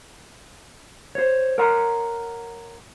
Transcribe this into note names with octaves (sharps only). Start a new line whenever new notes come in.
C5 C#5
A#4 C#5 F#5 A#5 C6